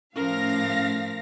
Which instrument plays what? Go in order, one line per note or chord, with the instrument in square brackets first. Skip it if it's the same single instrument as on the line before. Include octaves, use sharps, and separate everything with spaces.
[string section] A2 F5 A#6 [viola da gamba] F3 A#4 [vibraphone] C#4